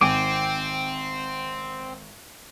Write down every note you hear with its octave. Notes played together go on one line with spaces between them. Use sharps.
G#1 C4 G5 G#5 D6